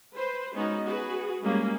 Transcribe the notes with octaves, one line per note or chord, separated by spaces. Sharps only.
B4 C5
G#3 B3 C#4 D#4 F#4
F#4 G#4 B4
G3 G#3 A#3 C#4 G#4